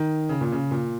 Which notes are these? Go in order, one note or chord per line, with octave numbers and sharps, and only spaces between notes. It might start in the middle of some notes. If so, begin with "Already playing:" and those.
Already playing: D#3
C#3
A#2
C#3
A#2